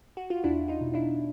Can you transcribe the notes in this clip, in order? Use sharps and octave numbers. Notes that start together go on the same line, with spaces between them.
F#4
F4
E2 D4 E4
D#4 F4
B2
D4 E4